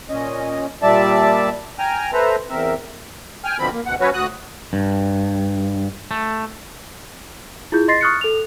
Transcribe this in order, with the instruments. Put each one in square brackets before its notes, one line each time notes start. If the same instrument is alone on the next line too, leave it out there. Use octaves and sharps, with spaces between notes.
[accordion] A#2 C#4 D#5
A#2 G3 D5 E5 A5
G5 G#5 A#5 F6
A4 B4 C5 E5 A#5
E2 C4 A#4 E5
G5 G#5 F6
B2 D3 F3 C4 B5
A#3
D2 B2 F#5
F#3 C#4 F#4 B4 C#5
D2 F#4 D#6 F#6
[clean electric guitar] G2
A3
[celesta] E4 F4 G#4 G6
D#5 C6 A6 A#6 C7
C#6 D#6 F6 F#6 A6 C#7
A4 F7